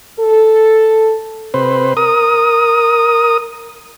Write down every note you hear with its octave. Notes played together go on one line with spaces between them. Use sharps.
A4
C3 B4 C5
A#4 D#6